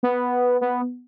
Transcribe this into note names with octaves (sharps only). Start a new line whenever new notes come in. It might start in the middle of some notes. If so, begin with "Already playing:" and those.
B3
B3